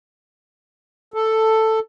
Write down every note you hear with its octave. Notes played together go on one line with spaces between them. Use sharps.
A4